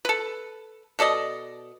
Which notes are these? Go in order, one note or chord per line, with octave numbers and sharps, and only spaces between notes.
A4 B4
B2 A4 D5 D#5